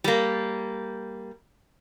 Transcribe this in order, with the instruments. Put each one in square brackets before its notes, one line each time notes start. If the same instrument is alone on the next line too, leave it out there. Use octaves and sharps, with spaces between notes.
[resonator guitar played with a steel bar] G3 A#3